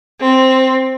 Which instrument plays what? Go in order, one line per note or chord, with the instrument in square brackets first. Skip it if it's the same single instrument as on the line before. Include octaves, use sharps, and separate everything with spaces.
[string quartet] C4